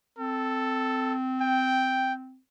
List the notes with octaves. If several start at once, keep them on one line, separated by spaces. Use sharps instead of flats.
C4 A4
G5